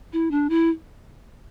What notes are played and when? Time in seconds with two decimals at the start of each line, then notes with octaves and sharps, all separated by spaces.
0.13 E4
0.31 D4
0.49 E4